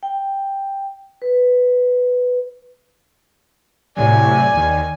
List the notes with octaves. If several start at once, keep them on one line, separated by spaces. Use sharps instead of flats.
G5
B4
A2 C3 F#3 D5 G#5
D#2 D#3